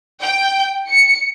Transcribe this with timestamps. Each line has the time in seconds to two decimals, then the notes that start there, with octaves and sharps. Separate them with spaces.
0.21 G5
0.90 C#7